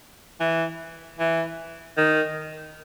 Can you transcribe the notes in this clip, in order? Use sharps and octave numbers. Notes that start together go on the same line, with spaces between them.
E3
E3
D#3